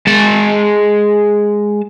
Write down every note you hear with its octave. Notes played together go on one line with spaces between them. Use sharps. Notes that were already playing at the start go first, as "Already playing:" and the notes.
G#3 A5